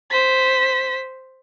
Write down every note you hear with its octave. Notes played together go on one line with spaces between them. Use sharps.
C5 B6